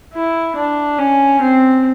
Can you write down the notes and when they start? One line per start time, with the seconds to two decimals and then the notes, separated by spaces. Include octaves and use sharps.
0.13 E4
0.56 D4
0.99 C#4
1.41 C4